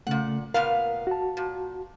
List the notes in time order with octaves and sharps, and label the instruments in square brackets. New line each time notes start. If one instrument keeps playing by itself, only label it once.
[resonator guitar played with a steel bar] A#2 F#5 [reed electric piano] C#3 A3
[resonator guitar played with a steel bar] A#2 B3 F5 [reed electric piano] A#4
[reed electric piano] F#4 A5
[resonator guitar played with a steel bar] A#2